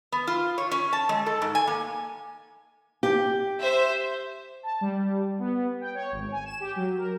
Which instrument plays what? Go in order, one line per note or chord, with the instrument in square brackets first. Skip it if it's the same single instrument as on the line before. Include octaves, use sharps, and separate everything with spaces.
[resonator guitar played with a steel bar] B3
F4
C#5
C#4
A5
G#3
A4
G#2
G#5
A#3
[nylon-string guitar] G4
[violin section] C5 E5
[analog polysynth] A5
G3
B3
G5
C#5
G#1
G#5
E7
G4
F#3
A#4